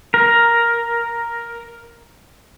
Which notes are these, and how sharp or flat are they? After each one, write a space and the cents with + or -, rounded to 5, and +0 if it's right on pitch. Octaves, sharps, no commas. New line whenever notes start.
A#4 +5